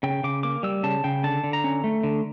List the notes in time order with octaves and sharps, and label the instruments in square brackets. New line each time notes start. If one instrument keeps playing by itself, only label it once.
[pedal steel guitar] C#3 G5
C#3 D6
A#3 D6
G3 E6
C#3 A5
C#3 G5
D3 A5
D3
A#5
C#4
A3
D3